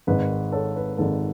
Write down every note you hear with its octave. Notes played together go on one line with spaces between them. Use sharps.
G#1 G#2 D#3 B4
A4 C#5
B4
G#1 G#2 D#3 A4